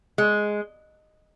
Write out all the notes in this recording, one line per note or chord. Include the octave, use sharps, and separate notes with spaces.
G#3